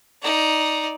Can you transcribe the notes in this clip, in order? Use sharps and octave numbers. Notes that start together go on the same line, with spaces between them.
D#4 D5